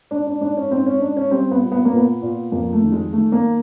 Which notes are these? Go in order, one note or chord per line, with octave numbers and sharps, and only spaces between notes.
G#2 D4
D4
G#2 D4
C#4
G#2 C4
C#4
G#2 D4
C#4
G3 C4
B3
A#2
B3
A#3
A#2
B3
A#2
F2 A#3
A3
D#3
G#3
D#3 A3
A#3